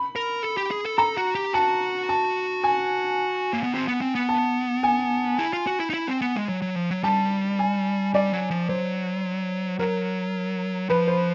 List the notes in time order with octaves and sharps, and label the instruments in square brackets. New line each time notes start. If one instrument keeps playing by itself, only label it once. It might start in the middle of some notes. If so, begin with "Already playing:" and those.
Already playing: [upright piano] B5
[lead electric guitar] A#4
A4
G4
G#4
A4
[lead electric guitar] A4 [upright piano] A#5
[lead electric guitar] F#4
G4
[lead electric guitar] F#4 [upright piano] A5
[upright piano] A5
G#5
[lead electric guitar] A#3
B3
C4
B3
C4
B3
[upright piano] A5
G#5
[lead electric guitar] E4
F4
F#4
E4
D#4
E4
C4
B3
G#3
F#3
F#3
F3
F#3
[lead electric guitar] G3 [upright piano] A5
[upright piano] G#5
[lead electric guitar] G3 [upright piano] D5
[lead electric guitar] F#3
F3
[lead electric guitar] F#3 [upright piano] C5
[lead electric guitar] F#3 [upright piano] A#4
[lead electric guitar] F3 [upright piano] B4
[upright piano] C5